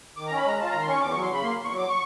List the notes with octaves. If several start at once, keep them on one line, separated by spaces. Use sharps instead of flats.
D#3 D6
C#4 A#5
B5
G#3 A#5
F4 A5
D#3 A#5
C6
C#4 C#6
E2 D6
F#3 C#6
C6
C#3 B5
A#3 C6
E2
C#6
F#3
D6
C#6